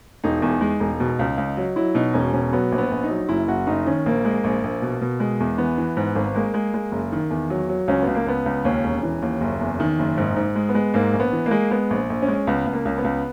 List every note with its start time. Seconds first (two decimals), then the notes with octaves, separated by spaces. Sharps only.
0.24 E1 D#4
0.42 E2
0.61 G#3
0.80 E1
1.00 B2
1.19 C#2
1.38 C#2
1.57 F#3
1.76 F#3 E4
1.95 B2 D#4
2.14 E1 C#4
2.33 B2 C#4
2.53 F#3 B3
2.72 A#1
2.78 B3
2.91 A#1
3.03 D#4
3.10 F#3
3.29 F#1 E4
3.48 F#1 F#4
3.67 F#1 D#4
3.86 D#3 C#4
4.06 A#1 A#3
4.25 G#3
4.44 A#1
4.64 A#1
4.82 B2
5.01 B2
5.20 G#3
5.40 E2
5.58 E3 B3
5.78 E3
5.97 G#2
6.16 G#1
6.35 G#3 A#3
6.54 G#3
6.74 G#3
6.92 F#1
7.12 D#3
7.30 E2
7.50 F#3
7.69 F#3
7.88 C#2 C#4
8.02 B3
8.07 C#2
8.15 A#3
8.26 C#2 B3
8.46 C#2
8.65 D#2 C#4
8.84 E1
9.03 E3
9.22 D#2
9.41 F#1
9.61 E2
9.80 D#3
9.99 F#1
10.17 G#2 D#4
10.36 G#2
10.55 G#3
10.69 B3
10.75 G#3
10.94 G#2 A#3
11.13 A#1
11.20 B3
11.33 E3
11.46 A#3
11.51 G#3
11.71 G#3 B3
11.90 A#1
12.10 A#1
12.22 C#4
12.28 G#3
12.47 C#2 B3
12.67 C#2
12.73 A#3
12.85 C#2
12.98 B3
13.04 C#2